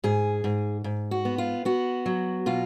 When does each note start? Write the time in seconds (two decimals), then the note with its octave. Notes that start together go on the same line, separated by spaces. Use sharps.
0.04 G#2 G#4
0.44 G#2
0.84 G#2
1.11 F#4
1.25 B3
1.38 F4
1.65 B3 F#4
2.06 F#3
2.46 B2 F4